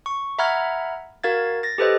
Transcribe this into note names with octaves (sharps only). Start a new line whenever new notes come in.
C#6
E5 F#5 A#5 B5 F6 G#6
F#4 A#4 F5 G#6 A6
A6 A#6
G4 A4 B4 C5 D#5